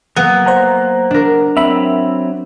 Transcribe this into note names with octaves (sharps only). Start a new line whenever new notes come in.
F#3 A#3 B3
C5 F#5 A#5
D4 A#4
F#3 C4 E5 B5